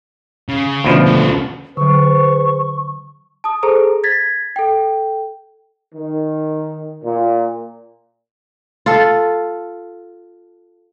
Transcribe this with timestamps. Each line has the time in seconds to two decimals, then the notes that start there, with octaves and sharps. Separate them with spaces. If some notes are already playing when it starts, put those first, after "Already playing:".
0.49 C#3
0.84 D2 B2 F3
1.05 C#2 A4
1.77 D3 F#3 G#4 B4 C5 C#6
3.44 A5 D#6
3.63 G#4 A4 C5 A#5
4.04 G#6 A6 B6
4.56 A4 G5
5.95 D#3
7.05 A#2
8.86 F4 A4